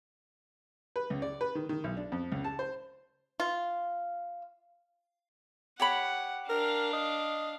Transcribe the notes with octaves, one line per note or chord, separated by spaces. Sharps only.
B4
C#2
D5
B4
D#3
D#3
B1
D4
F2
C#2
A5
C5
F4
G4 C#5 F#5 B5
D4 A#4 F5
D#5